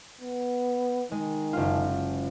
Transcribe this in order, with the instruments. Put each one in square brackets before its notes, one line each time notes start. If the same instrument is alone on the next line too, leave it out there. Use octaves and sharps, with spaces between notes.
[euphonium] B3
[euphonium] D#3 [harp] G#3
[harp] F#1 F4